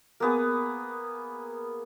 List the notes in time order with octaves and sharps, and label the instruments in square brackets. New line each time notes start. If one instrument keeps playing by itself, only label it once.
[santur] A#3 B3 G#4